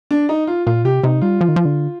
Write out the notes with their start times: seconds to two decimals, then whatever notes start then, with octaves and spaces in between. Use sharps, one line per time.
0.11 D4
0.29 D#4
0.47 F4
0.67 A#2 F4
0.85 C3 G4
1.04 C3 D#4
1.21 G3 F4
1.41 F3
1.48 D#3
1.56 F3
1.65 D3